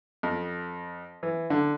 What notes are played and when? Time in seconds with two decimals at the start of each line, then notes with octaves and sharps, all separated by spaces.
0.23 F2
1.23 E3
1.50 D3